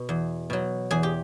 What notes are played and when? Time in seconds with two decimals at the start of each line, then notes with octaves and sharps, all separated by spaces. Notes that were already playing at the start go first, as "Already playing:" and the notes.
Already playing: B2
0.09 E2
0.50 B2 F#3
0.91 E2 G#4
1.03 G4